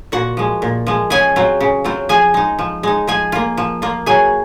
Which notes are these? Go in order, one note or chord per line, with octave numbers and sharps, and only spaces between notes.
A#2 F#4 F#5
F3 G#3
A#2
F3 G#3
C#3 G#4 G#5
F#3 C4 F4
C#3
F#3 C4 F4
F3 G#4 G#5
G#3 D#4
F3
G#3 D#4
F3 G#4 G#5
A#3 F4
F3
A#3 F4
F#3 G#4 G#5